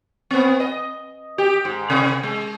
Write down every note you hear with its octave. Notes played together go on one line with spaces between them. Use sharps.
B3 C4
D#5
G4
G#2
C3
G#3